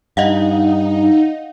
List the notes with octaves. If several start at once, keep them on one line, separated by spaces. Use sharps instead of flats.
G2 D#4 D#5 F5 F#5